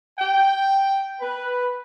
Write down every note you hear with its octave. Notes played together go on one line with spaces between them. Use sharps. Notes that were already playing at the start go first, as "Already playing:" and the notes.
G5
B4